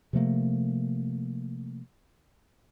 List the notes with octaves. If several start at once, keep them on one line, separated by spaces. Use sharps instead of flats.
C3 F3 A3 A#3